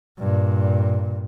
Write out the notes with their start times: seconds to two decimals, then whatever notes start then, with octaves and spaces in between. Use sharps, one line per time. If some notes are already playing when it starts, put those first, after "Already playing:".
0.19 G2 A#2